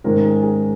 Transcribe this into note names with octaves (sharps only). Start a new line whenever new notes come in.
G#2 D#3 G#3 C#4 A#4
G#4
G#4